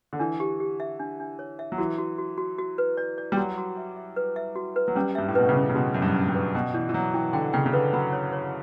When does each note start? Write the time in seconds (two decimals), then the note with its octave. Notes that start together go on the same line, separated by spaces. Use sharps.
0.13 D3
0.19 E3 D4
0.40 G4
0.60 G4
0.80 E5
1.00 D4
1.20 D4
1.39 C#5
1.59 E5
1.72 F#3
1.78 E3 F#4
1.98 F#4
2.18 F#4
2.38 F#4
2.59 F#4
2.78 B4
2.97 D5
3.18 D5
3.32 G3
3.37 F#3 F#4
3.58 F#4
3.77 E5
3.96 E5
4.16 B4
4.36 E5
4.56 F#4
4.76 B4
4.88 F#3
4.96 G3 C#4
5.15 G2 E5
5.28 A2
5.35 B2 B4
5.49 C#3
5.56 C#4
5.69 C#3
5.75 B2 F#4
5.94 F#2 E5
6.02 G2
6.15 C#4
6.28 G2
6.34 B4
6.54 B2 G5
6.74 E3 D5
6.89 E3
6.94 F#3 D5
7.14 E3 G5
7.33 D3 G5
7.53 C#3 G5
7.66 C#3
7.73 D3 B4
7.93 F#3 B5
8.13 C#5
8.33 C#5